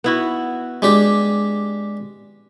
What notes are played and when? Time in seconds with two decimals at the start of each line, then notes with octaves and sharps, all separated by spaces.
0.04 B3 E4 F#4
0.82 G#3 D4 G4